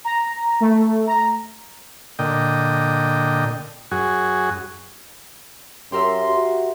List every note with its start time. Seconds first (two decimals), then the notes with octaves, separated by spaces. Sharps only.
0.04 A#5
0.60 A3
1.07 A#5
2.19 A#2 D3 D#5 G5
3.91 F#2 F#4 G#4
5.92 F#2 G4 A#4 E5 C6
6.26 F#4